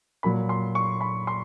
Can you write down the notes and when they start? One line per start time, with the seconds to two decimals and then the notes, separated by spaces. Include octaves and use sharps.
0.23 A#2 F#3 B5
0.49 C6
0.75 C#6
1.01 B5
1.27 C6